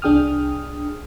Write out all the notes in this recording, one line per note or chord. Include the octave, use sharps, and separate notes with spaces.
C2 D4 G#4 G5 D#6 F6